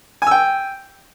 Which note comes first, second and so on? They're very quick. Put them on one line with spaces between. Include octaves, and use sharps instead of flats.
G#5 E6 G5